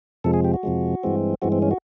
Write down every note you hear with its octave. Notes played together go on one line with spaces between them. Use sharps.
F2 C3 F3 G#3 A4
G#4
G4
F#4
F2 C3 F3 G#3
G2 E3 G#3 C4
G2 E3 G#3 C4 F#4
C4
C#4
F#4